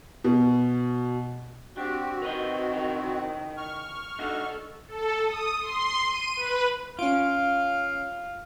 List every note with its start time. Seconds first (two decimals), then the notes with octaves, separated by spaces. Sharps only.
0.24 B2
1.77 C4 D4 F#4 G4
2.22 D#3 A#4 B4 D#5
2.73 C#3 E3 A#4
3.57 C#6 F6
4.19 D4 D#4 F#4 A4
4.88 A4
5.25 D#6
5.60 C6
6.05 D#7
6.36 B4
6.99 C#4 F4 F5 D7